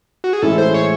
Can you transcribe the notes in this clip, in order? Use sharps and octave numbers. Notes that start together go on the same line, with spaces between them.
F#4
G#4
A2 E3 G#3 C#4 E4 A4
C5
C#5